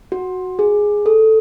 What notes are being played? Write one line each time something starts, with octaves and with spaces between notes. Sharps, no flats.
F#4
G#4
A4